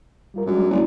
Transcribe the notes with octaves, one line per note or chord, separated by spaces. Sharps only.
G3 F4 A#4
F#2 G3 G#3 D4
F#1 E4 C#5 D5